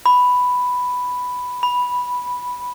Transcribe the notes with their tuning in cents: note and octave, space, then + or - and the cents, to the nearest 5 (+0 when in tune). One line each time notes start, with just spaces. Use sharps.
B5 +5
B5 -5